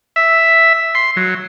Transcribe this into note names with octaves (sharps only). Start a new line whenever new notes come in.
E5
C6
F#3